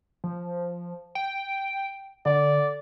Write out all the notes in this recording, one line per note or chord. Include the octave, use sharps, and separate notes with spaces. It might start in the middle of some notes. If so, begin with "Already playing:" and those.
F3
G5
D3 D5